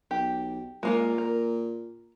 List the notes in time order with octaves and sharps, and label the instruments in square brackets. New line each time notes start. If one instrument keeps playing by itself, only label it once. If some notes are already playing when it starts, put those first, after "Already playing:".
[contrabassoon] B1 [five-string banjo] G4
[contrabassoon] A#2 [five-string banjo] G#3 A#3 F4
[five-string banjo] A#4